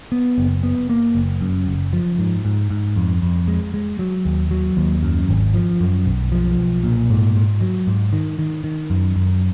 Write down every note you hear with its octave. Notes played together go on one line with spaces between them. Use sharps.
B3
F#1
B3
A#3
F#1
F#2
F#1
F3
G#2
G#2
G#2
F2
F2
G#3
G#3
F#3
D#2
F#3
D#2
F#2
G#1
F3
F#2
B1
F3
B1
A#2
G#2
G#2
F#3
G#2
D#3
D#3
D#3
F#2
F#2